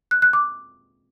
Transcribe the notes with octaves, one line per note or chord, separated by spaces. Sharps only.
F#6
F#6
D6